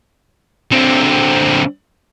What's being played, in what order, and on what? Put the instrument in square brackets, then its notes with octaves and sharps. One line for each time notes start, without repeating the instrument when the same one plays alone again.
[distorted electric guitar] D3 C4